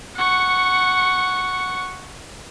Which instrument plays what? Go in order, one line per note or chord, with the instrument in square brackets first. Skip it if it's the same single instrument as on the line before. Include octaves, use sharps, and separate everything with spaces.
[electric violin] F#5 C#6